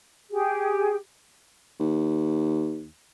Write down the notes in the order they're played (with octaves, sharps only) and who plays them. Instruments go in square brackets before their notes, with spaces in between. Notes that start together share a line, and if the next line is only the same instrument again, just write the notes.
[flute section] G4 G#4
[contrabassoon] D#2